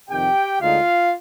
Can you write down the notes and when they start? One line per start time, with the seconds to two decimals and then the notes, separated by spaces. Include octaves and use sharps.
0.10 F2 C3 D#3 G4 G5
0.60 D2 D3 G#3 D#4 F4 F5